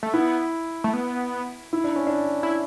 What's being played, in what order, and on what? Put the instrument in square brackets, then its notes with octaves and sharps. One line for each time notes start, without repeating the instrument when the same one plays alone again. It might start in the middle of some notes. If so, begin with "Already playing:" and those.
[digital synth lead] A3
[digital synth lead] B3 [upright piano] E4
[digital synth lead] A3
B3
[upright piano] E4
D4
C#4
D4
[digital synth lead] E4